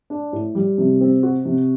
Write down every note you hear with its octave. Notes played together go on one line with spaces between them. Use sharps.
D4
A2
G3
C3
C4
F#4
C3